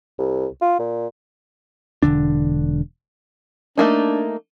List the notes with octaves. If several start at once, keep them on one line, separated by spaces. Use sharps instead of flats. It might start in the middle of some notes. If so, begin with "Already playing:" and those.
C2
F4
A#2
E1 D#2 D3 D4
A3 A#3 D4 D#4